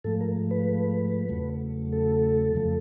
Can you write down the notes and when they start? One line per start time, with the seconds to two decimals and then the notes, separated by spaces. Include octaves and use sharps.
0.04 G#2 F3 A3 A4
0.21 A#4
0.51 B4
1.29 E2 C#3 F#3 A3
1.93 A4
2.54 F2 C#3 F3 A3